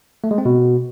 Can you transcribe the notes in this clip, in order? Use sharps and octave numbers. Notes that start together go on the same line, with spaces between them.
A3
G#3
C4
B2